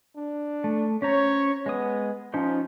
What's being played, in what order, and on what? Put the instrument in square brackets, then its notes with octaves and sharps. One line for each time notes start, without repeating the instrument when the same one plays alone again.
[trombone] D4
[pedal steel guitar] A3
[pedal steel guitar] C#4 C5 A#5 [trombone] C#5
[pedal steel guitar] G#3 D#6 [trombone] B3
[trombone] F3 [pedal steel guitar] C#4 D#4 C5